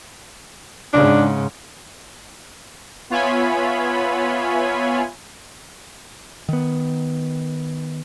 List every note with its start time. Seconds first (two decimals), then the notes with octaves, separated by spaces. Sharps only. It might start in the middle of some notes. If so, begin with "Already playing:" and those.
0.93 G#2 C#3 D4
3.10 B3 F4 C#5 E5 G#5 B5
6.49 D#3 B3